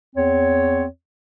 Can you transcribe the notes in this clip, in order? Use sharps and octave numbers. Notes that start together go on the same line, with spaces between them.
E2 C4 C#5